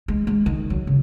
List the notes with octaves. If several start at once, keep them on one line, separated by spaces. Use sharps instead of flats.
G#3
G#3
D#3
F#3
C#3